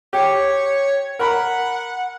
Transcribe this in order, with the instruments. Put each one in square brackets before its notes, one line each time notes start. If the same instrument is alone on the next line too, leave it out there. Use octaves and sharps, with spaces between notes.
[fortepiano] G4 [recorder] C#5
[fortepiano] A#4 B5 [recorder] F#5